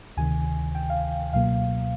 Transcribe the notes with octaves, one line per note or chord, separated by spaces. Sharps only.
D2 C3 D#3 G#5
G5
F5
C#2 B2 F#3 A#3 F5